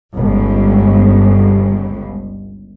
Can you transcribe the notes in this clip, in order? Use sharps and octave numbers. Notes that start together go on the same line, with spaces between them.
G1 C#2